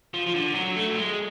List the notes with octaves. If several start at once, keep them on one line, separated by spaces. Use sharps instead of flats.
F3
F3
D3
F#3
A3
F#3
G#3